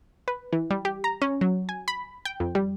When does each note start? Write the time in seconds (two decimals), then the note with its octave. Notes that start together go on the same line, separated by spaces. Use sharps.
0.28 B4
0.53 E3
0.71 G3
0.85 G4
1.04 A#5
1.22 C#4
1.41 F#3
1.69 G#5
1.88 B5
2.25 G5
2.40 F2
2.55 G3